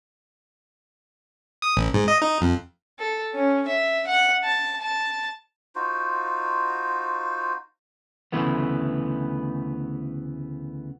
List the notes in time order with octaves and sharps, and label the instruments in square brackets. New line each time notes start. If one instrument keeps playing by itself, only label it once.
[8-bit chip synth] D#6
A1
G#2
D#5
D#4
F2
[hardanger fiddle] A4
C#4
E5
F#5
A5
A5
[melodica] D#4 F4 F#4 C5
[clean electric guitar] D2 C#3 E3 A3 B3